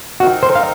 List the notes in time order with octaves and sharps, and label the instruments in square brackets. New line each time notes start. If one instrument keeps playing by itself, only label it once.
[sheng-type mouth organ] C4 D#4 A#4 [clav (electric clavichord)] F#4
[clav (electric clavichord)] C5
F5